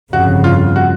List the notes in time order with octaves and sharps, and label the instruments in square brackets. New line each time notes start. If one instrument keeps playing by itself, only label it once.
[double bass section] G1 F2 C#3 [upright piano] F#4
[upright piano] F4
F#4